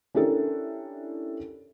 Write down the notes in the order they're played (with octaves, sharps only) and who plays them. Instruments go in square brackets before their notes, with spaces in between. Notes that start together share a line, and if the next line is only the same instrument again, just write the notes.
[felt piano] C#4 D4 E4 G4 A4 A#4